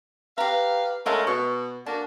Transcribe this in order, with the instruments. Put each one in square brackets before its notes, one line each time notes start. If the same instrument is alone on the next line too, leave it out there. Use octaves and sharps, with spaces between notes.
[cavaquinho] G4 A#5 [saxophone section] B4 F5
[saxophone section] G#3 A3 C#4 [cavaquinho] A#4 F5 A5
[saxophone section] B2 [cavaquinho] C#6
[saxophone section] A#3 D4 F#4 [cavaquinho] A5